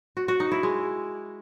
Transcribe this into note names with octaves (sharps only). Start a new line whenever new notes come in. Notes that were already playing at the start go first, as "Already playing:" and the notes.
F#4
F#4
D#4
E4
G#3